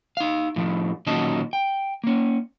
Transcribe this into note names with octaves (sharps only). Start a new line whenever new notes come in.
D#4 F5
A2 F3
A#2 D#3 F#3 C#4 D#5 A5
G5
A#3 C#4